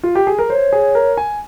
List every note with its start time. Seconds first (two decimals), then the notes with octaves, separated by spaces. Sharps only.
0.03 F4
0.15 G4
0.27 G#4
0.39 A#4
0.50 C5 C#5
0.73 G#4
0.95 A#4
1.17 G#5